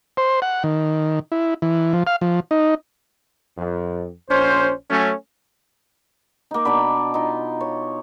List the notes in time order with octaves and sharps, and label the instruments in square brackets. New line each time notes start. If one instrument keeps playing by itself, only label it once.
[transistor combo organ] C5
F#5
D#3
E4
E3
F3
F5
F3
D#4
[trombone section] F2
A#1 C#4 C5
F#3 A3 C#4
[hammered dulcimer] A#3 D#4
B2 D4 D5 B5
D#4 F4
C#5